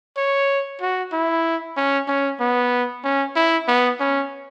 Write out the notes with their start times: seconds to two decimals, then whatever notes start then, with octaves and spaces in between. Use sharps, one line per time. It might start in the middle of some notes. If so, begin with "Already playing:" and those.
0.17 C#5
0.81 F#4
1.13 E4
1.77 C#4
2.08 C#4
2.40 B3
3.04 C#4
3.36 E4
3.68 B3
4.00 C#4